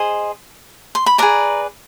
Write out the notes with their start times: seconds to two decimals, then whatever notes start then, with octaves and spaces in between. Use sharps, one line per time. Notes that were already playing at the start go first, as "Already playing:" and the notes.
Already playing: G#4 C5 D#5
0.95 C6
1.06 B5
1.18 G#4 B4 D5 A#5